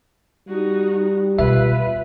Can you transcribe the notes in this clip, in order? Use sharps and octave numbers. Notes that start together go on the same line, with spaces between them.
G3 D#4 F#4
B2 F4 B4 E5